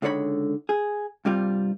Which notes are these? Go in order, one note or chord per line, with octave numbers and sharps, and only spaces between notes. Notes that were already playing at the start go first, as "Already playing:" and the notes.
C#2 D3 D#4 C#5 B5
G#4
G2 C3 G3 F4